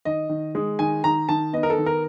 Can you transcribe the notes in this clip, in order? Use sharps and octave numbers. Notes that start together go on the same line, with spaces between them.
D#3 D#5
D#3
G#3
D#3 G#5
D#3 A#5
D#3 A5
B3 D#5
A#4
A4
D#3
A#4